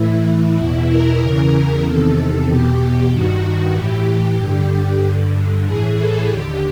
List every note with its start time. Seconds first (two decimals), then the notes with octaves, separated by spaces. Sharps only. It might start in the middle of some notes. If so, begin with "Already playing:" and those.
Already playing: A2 E3 E4
0.56 E2 B2 E4
0.88 A#4
1.19 E2 C#3 E3
1.83 E2 C3 D#3 A4
2.46 E2 B2 G4
3.10 G2 D#3 F#4
3.74 A2 E3 G4
4.38 G2 D3
5.01 G2 D3
5.64 A2 E3 G#4
5.96 A4
6.28 D#2 D3 G4